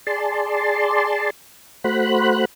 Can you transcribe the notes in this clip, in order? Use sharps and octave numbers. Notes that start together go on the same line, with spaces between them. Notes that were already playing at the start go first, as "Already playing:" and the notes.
G#4 D5 A5 C6
A3 F#4 C5 B5 F#6